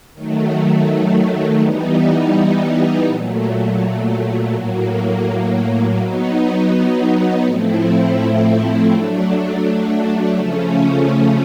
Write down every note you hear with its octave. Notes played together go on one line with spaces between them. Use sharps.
D#3 F#3 A3
E3 G3 B3 D#4
A#2 F#3 A3
A2 F#3 A#3
F#3 B3 D#4
A2 F3 A3 C4 E4
F#3 A3 D4
C#3 F3 A3 C#4